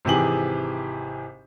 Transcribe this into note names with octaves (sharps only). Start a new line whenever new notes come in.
G#1 C3 E3 G4 G#4 F#7